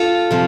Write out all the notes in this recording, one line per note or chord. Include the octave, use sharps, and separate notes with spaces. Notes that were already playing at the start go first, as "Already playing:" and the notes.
Already playing: F4 A4
C3 F3